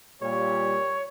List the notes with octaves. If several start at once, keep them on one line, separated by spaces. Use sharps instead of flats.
A#2 G3 C#5